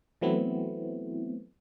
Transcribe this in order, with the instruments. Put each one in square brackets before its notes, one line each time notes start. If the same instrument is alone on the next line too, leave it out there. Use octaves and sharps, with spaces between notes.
[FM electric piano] E3 F#3 A3 B3 C4 E4